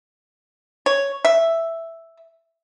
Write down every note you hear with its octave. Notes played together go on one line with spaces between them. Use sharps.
C#5
E5